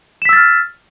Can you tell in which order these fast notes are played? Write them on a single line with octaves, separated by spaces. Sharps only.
E7 B6 E6 A6 F6